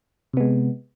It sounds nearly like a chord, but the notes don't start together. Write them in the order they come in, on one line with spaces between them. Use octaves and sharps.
C3 B3 G#3